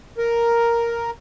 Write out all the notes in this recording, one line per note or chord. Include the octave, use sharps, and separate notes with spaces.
A#4